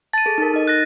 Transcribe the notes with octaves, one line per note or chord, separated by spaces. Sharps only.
A5 A6 D#7
G#4 A4
D#4 A#4
D#4 D#5
F#6 A#6